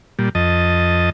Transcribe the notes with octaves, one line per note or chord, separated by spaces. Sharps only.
A#2 G3
F2 D#5 A5